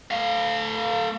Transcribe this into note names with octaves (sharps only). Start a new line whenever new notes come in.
A3 F5